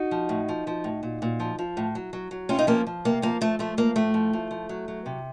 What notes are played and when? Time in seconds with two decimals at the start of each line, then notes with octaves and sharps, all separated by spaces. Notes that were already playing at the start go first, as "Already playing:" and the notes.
Already playing: D#4 F#4
0.11 F3
0.29 A2
0.49 F3
0.67 F3
0.84 A2
1.03 A#2
1.22 A#2
1.40 F3
1.59 F3
1.77 A2
1.95 F#3
2.13 F#3
2.31 F#3
2.49 C3 C#4 F4
2.59 D#4
2.67 F3 A#3 C#4
2.87 F3
3.05 C3 A#3
3.22 F3 A#3
3.41 F3 A3
3.59 F3 A3
3.77 F3 A#3
3.96 A2 A3
4.14 F3
4.33 F3
4.51 F3
4.69 F#3
4.88 F#3
5.06 C3